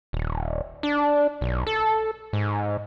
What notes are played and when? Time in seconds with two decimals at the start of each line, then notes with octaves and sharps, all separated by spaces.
0.13 D#1
0.83 D4
1.41 B1
1.67 A4
2.33 G#2